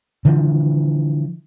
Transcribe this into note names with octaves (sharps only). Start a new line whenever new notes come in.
D3 E3 F3